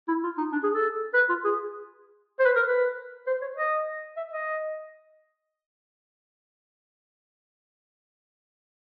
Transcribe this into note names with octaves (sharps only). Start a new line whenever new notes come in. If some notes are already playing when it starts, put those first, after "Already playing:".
E4
F4
D#4
D4
G#4
A4
B4
F4
G#4
C5
B4
A#4
B4
C5
C#5
D#5
E5
D#5